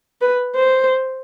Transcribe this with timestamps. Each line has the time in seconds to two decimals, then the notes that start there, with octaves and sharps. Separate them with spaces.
0.21 B4
0.56 C5